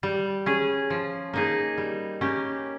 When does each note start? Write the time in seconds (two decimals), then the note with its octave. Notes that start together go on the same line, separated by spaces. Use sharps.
0.03 G3
0.46 C#4 G#4
0.90 F3
1.33 A#3 D#4 G#4
1.78 G3
2.21 A#3 C#4 G4